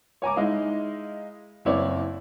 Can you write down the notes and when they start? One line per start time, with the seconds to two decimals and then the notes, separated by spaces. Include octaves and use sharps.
0.22 C#5 G#5 A#5 D6
0.36 G#3 D#4 E4 D#5 F5
1.65 F#1 C4 E4 C#5 D5